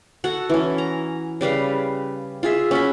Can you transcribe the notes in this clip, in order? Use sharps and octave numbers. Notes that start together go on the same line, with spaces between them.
F#4 A4 F#5
E3 C#4
A#5
C#3 G3 B4 F5
F4 G#4 E5
C#4 F#4 B5